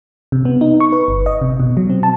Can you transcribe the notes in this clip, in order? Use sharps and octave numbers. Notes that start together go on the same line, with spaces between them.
C3
B3
D#4
C#6
B4
G1
D#5
C3
B2
F#3
C4
A5